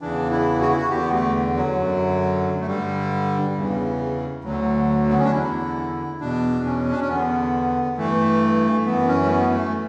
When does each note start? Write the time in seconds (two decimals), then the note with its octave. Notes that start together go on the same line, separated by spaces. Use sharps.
0.01 E2 C#3 E3 D4
0.31 E4
0.61 F#4
0.69 E4
0.77 F#4
0.90 E2 D3 G4
1.01 B3
1.12 A3
1.56 F#3
1.78 F#2 D3
2.60 A3
2.67 G2 D3 G3
3.55 E2 C#3 E3
4.44 D2 D3 F#3
5.10 B3
5.18 C#4
5.25 D4
5.32 E2 D3 E4
6.20 E2 B2 D4
6.65 C#4
6.91 D4
7.00 C#4
7.09 E2 D3 B3
7.97 G2 E3 A3
8.86 F#2 E3 B3
9.08 C#4
9.25 A3
9.30 B3
9.53 A3